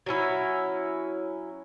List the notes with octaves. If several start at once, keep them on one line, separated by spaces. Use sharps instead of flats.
F#3 C#4 E4